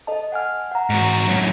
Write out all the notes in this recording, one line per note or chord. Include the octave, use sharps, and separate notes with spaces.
A4 D#5 A5
F#5 G#5 F6
F#5 A#5
G#2 F#4
F#2 A2